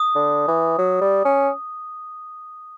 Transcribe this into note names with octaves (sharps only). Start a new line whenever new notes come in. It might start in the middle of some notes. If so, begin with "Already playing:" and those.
Already playing: D#6
D3
E3
F#3
G3
C#4